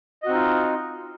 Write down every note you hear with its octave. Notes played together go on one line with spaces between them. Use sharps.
C4 D#4 F4 F#4 D#5